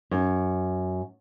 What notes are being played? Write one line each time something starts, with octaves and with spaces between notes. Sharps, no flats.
F#2